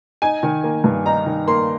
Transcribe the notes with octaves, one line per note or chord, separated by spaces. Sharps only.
D#4 G#5
D#3
A#3
G2
D#4 A#5
D#3
A#3 C6